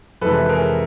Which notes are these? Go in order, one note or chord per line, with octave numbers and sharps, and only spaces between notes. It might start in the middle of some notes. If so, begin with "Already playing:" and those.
F2 C3 E3 G#3 A4 B4
G#4 A#4